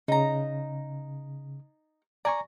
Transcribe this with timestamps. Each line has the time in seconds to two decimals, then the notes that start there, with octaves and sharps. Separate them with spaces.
0.08 C#3 D#4 A#5
2.25 D5 G#5 A#5 C#6